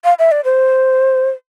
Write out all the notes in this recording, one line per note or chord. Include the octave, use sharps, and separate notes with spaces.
F5
E5
D5
C5